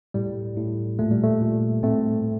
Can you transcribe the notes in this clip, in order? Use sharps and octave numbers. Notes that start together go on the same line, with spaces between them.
A2 G3
A2
A#2 A3
G3
A3
A#2
A2 A3 C4